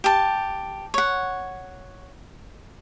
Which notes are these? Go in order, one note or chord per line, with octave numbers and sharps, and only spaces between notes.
G4 A5
C#5 F#5